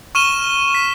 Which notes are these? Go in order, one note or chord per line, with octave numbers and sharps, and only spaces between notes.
C#6 F6 D#7 E7 G7
B6